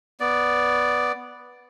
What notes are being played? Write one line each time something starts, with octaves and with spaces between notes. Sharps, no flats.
B3 D5